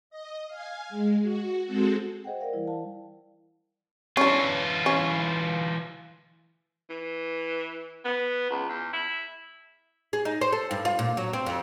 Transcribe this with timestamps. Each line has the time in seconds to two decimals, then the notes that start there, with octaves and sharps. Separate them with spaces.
0.10 D#5
0.47 F5 G#5
0.89 G#3
1.23 F#4
1.65 G#3 C4 F#4 A4
2.24 G#4 C5 D#5 F#5 G5
2.40 A#4 D5 F5 G5
2.53 E3 G3 E4
2.67 G#4 F5 A5
4.17 E3 C#4 D4 F4
4.86 C#4
6.90 E3
8.05 B3
8.50 C#2
8.69 E2
8.93 E4
10.13 G#4
10.25 D#4
10.41 C5
10.53 A4
10.71 G2
10.85 F4
10.99 A#2
11.17 F#3
11.33 C4
11.46 F2